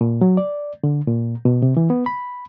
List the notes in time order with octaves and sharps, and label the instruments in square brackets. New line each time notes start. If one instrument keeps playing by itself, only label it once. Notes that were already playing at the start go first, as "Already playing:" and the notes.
[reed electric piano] A#2
F#3
D5
D3
A#2
B2
C3
E3
B3
B5